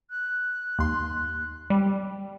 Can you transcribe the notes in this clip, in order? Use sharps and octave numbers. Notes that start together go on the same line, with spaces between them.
F#6
D#2 C6
G3